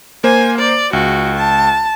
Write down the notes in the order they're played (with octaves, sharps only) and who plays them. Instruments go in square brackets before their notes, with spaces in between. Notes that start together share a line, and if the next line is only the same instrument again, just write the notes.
[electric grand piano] A#3 C5 [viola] G#5
[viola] D5
[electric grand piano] C#2 [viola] F#4
[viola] A5